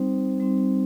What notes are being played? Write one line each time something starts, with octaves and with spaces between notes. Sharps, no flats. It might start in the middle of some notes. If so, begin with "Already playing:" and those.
Already playing: G3 C4 D#4 C5
G3 C4 D#4